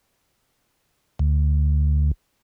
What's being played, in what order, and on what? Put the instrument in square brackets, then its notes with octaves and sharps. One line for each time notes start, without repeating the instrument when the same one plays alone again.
[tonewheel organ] D2